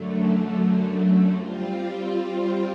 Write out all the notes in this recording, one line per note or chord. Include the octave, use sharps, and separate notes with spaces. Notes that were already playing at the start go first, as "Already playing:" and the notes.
Already playing: F#2 D3 F#3 A3
G3 C4 F4